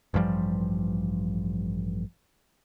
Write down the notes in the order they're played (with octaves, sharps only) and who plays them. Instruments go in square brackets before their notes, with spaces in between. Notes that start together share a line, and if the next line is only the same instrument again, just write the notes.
[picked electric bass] A1 G2 F3 G3